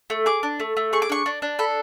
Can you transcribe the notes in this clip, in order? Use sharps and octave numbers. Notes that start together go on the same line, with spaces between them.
A3
G#4 D6
D4
A3
A3
G#4 C#6
D6
D4 C#6
D4
D4
A4 B5